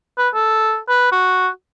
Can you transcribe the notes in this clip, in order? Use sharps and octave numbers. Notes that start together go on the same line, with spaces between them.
B4
A4
B4
F#4